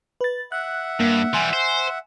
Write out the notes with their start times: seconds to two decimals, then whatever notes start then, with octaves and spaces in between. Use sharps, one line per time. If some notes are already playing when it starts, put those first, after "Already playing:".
0.21 B4 A6
0.52 E5 F#5 F#6
1.00 G2 A#3
1.33 E3 G3 G#5 C6
1.53 C5